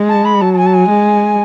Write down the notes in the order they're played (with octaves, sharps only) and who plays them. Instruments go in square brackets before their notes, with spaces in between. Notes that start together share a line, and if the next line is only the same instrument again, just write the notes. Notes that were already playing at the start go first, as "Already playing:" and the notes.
Already playing: [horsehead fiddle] G#3
[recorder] A5
B5
[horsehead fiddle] F#3 [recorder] A5
[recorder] A5
G#5
A5
G#5
[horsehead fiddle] G#3